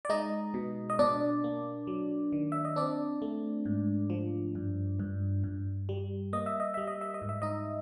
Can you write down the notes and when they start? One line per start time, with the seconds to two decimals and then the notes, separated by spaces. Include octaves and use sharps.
0.05 D5
0.09 G#3 D#4 D#5
0.54 B2
0.90 D#5
0.99 B2 D4 D5
1.44 A#3
1.87 F#3
2.32 D#3
2.52 E5
2.65 D#5
2.76 C4 D4 D5
3.22 A3
3.65 G#2
4.10 F3
4.55 G2
4.99 G2
5.44 G2
5.89 G3
6.33 A#3 D#5
6.46 E5
6.60 D#5
6.74 G3 E5
6.87 D#5
7.01 E5
7.14 D#5
7.22 G#2
7.29 E5
7.42 D#4 D#5